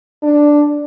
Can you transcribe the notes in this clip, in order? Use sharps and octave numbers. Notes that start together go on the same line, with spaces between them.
D4